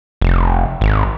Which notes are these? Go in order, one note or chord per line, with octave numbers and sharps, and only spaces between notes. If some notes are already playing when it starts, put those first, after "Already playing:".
F1
G#1